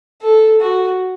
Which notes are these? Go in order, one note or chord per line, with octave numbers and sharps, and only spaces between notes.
A4
F#4